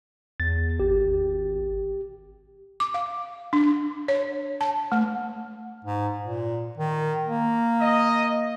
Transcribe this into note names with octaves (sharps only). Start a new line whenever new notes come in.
E2 A6
G#1 G4
D6
F5
D4
C#5
A5
A3
G#2
A#2
D#3
A#3
D#5